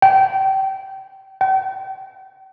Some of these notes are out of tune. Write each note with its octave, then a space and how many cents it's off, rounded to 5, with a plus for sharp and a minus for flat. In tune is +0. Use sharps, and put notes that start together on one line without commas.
G5 -25
G5 -40